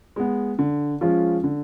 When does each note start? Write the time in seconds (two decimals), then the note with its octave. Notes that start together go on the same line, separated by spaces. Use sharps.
0.16 G#3 B3
0.59 D3
1.01 F3 G#3 C#4 F4
1.44 D3